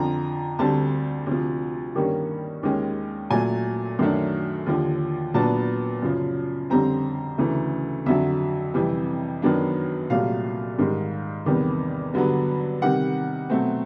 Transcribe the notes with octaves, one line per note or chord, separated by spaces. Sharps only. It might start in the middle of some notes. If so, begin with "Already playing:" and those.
Already playing: F2 D3 F3 A#5
D2 D3 G3 C4 A5
D2 C3 F3
G2 D#3 G3 A#3 C#4
D#2 D#3 G#3 C#4
A#2 F#3 A3 G#5
F#2 D#3 F#3 A3 D4
D#2 D3 F3
A#2 F#3 B3 D4 A5
F#2 C#3 F3
F2 D3 G3 C4 A#5
D2 C#3 E3 A3
F2 D3 F#3 E5
F2 C3 E3 G3
F#2 D#3 F#3 B3 D4
C2 A#2 F#3 A3 F5
G#2 D#3 G3
E2 C3 D#3 G3 B3
G2 D3 F#3 B3
C3 D#3 G3 F#5
B2 F#3 A3 C4